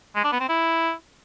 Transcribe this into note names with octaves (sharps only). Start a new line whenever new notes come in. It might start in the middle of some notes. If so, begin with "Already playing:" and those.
G#3
D4
B3
C4
E4